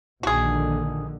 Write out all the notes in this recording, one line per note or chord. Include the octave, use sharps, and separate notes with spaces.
A#1 D3 D#3 F#4 G#4